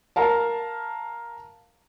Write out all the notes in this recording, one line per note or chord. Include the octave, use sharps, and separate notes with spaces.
A#4 F5 A5